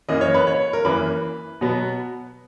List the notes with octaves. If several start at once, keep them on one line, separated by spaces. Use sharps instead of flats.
F#2 E3 A#3 D#5
C#5
B4
C#5
A#4
F#2 E3 A#3 B4
B2 F#3 B3